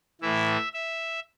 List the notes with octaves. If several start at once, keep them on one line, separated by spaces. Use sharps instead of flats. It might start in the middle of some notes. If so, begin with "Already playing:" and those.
A2 E3 E5
E5